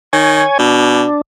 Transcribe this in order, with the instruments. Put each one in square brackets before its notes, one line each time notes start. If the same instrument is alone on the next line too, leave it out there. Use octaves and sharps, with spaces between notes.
[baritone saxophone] D#3 [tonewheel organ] C#5 G#5
[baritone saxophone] B2 [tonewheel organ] D4